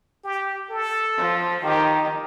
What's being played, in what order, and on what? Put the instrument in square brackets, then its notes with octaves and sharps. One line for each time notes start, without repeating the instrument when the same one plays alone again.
[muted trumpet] G4
A4
[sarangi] F3
[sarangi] D#3 [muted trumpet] G4